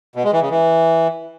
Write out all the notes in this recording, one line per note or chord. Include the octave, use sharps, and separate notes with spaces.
B2
G#3
E3
C#3
E3